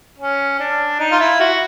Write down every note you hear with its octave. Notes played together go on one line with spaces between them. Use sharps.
C#4
D4
D#4
F4
E4
F#4